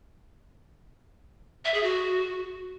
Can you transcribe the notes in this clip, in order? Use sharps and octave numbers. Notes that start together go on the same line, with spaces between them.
E5
G#4
F#4